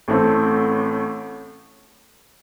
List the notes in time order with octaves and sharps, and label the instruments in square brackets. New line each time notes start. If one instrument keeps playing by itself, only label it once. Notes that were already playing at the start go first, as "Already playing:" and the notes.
[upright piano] A1 A2 A3 C4